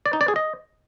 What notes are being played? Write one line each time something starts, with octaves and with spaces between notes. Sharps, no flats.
D5
D#4
D5
G#4
D#5